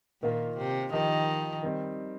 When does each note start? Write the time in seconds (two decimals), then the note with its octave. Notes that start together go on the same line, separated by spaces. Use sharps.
0.22 A#2 D#3 A#3 F4 A#4
0.57 C3
0.92 D#3 F3 D#4 G4 A#4 D#5
1.63 D#3 G3 C4 D#4